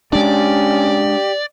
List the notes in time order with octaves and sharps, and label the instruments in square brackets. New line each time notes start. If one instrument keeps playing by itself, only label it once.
[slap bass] G#3 D4 [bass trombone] C#4 [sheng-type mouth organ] G4 [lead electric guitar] D5